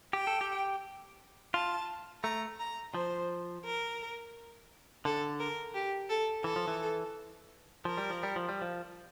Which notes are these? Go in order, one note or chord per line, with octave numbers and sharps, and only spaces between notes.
G4 G5
A4
G4
F4 A5
A3 A#5
A#5
F3 C5
A#4
D3 A4
A#4
G4
A4
E3 A4
F3
E3
F3 A#4
G3
F3
G3
F3
G3
F3